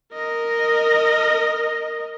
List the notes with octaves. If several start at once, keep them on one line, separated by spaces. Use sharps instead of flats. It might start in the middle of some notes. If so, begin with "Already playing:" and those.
A#4 D#5